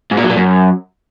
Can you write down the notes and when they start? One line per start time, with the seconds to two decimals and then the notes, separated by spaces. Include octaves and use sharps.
0.11 G#2
0.17 A#2
0.24 F#3
0.30 A#2
0.36 F#2